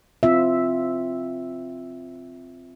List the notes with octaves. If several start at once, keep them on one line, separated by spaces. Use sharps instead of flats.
C4 F4 E5